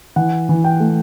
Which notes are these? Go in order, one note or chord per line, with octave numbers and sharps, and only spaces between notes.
E3 F#5
E3
G5
A3